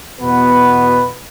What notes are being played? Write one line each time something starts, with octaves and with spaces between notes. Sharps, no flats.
E2 B2 B3 F#4 B4